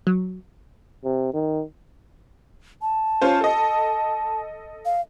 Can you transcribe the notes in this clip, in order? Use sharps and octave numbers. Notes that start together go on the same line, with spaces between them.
F#3
C3
D#3
A5
C#4 F4 C5
A4 D#5
F5